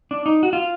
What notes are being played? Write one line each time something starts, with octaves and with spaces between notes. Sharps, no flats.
D4
D#4
F#4
F4